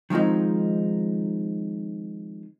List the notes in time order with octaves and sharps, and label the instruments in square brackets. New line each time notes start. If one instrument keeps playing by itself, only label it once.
[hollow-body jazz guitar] D#3 F3 G#3 C4 D#4